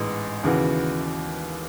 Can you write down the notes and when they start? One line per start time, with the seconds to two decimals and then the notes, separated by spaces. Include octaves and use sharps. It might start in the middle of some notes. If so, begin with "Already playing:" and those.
Already playing: A1 G#2 E3 G#3 B3
0.43 D#2 C#3 E3 B3 F#4